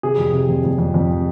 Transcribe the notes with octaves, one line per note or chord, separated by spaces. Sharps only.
C3 G#4
F2
C3
F2
F2
F2
F2